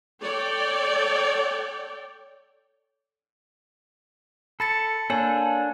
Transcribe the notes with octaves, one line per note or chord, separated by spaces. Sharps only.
A4 C#5 D5 G5
A4 B5 A6 C#7
A#3 D4 A4 C#5 G#5